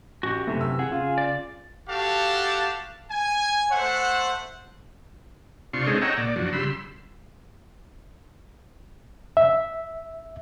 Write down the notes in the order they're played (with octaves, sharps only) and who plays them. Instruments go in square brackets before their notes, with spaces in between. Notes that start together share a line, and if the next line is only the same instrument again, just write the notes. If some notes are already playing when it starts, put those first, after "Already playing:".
[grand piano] A1 [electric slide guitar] F#4 G4
[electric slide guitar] F#2 C3 E3 [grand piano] A3
[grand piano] E6
[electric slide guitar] G#4 [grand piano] F#5
[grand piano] C#3 F4
[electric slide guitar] D5
[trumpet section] F#4 G4 A4 F5 F#5 A5
G#5
A3 C5 E5 F#5
[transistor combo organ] C3 D4 F4 C6 C#6
G#3 C4 C#4 D#4 G#4 A4
C#5 D#5 F#5 G5 A#5 E6
A#2 D5
F#2 F3 D4 F#4
C#3 G3 B5 C6 E6
[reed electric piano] E5